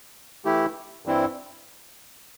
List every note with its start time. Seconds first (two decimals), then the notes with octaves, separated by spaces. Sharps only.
0.45 E3 A3 E4 G4
1.05 G2 E3 G3 C4 E4